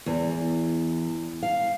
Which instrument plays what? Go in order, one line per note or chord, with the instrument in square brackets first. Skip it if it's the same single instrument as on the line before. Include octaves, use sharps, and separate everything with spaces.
[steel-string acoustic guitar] E2
F5